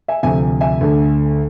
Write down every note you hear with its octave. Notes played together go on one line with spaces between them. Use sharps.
E5 G#5
D2 C3 F3 E5 G#5
E5 G#5
D2 D3 A3